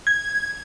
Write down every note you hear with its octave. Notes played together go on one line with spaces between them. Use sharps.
G#6